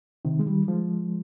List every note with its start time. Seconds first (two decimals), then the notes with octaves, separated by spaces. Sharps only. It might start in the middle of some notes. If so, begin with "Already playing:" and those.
0.25 C3 D#3
0.39 G#3
0.46 D#3 G3
0.68 F3 G#3